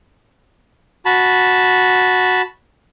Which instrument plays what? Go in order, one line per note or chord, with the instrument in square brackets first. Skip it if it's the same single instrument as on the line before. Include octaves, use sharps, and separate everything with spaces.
[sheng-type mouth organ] F#4 A5 B5